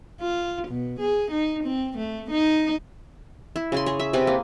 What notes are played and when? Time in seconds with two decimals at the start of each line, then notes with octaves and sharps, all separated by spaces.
0.21 F4
0.68 B2
1.00 G#4
1.31 D#4
1.64 C4
1.98 A3
2.31 D#4
3.56 E4
3.72 C#3 G#4 C6
3.86 G#4 C#5
3.99 E5
4.13 C3 B4 G#5
4.27 A#3